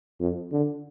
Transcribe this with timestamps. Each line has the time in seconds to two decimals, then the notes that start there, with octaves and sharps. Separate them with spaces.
0.20 F2
0.52 D3